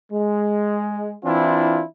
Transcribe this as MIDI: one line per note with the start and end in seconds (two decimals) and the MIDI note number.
0.12 1.14 56
1.24 1.83 52
1.24 1.83 60
1.24 1.83 62
1.24 1.83 64
1.24 1.83 65